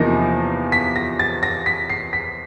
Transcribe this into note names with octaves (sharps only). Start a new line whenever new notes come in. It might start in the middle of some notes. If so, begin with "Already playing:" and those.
Already playing: E2 C3 F3 A#3 D#4 A#6
B6
A#6
A6
A#6
B6
C7
B6